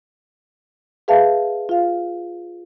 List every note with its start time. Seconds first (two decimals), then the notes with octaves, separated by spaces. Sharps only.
1.08 G#4 B4 E5 F5 A5
1.69 F4 F5